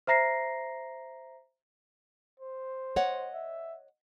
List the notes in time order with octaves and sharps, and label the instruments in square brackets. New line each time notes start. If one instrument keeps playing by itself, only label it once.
[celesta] C5 E5 A#5 A#6 C7
[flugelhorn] C5
[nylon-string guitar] C#5 D#5 F#5
[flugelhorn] E5